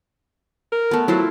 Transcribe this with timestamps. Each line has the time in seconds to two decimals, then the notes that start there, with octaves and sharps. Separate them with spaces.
0.72 A#4
0.91 A3 B3
1.08 F#3 E4 F4 C5